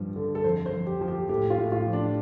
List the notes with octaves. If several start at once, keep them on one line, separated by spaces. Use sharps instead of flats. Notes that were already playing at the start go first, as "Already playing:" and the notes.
Already playing: G2 F3
D3
A4
F2 C5
C5
F2
G4
F3
G4
A2 G4
F4
A2
F4
F3
D4